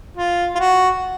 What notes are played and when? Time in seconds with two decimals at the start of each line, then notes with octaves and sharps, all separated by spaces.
0.17 F4
0.55 F4
0.59 F#4